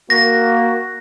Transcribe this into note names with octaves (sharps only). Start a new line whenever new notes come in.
A#3 F#4 A#6